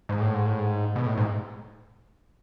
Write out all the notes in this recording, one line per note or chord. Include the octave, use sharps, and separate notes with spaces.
G#2
A2
G#2
A2
G#2
B2
A2
G#2